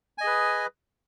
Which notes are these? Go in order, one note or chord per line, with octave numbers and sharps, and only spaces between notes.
G#4 B4 D#5 G#5